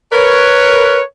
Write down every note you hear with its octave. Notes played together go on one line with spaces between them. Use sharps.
A#4 B4 C#5